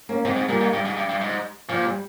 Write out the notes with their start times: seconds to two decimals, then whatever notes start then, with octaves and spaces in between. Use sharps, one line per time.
0.09 A#3 C#4
0.25 G#2 G#3 C4
0.37 G#2
0.48 A#2 G3 A#3
0.61 G#2
0.73 G2 G3
0.85 G#2
0.97 G2
1.09 G2
1.21 G#2
1.69 A#2 F3
1.85 G3